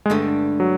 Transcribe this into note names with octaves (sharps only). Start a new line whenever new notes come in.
G#3
G2 D3 G3 A3
F#3